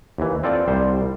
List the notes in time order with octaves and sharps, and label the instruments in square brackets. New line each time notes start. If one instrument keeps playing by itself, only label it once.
[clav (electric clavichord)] D#2 E3
C4 F4 A4 D5
C2 G3 C5